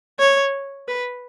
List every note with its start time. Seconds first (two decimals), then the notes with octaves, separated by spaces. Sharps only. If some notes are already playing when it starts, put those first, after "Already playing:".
0.19 C#5
0.88 B4